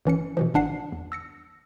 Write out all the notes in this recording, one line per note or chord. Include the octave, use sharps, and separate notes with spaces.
G1 E3 C#4 C#7
B2 E3 F3
G#1 D4 F#5 C7
E2
E6 A#6 C#7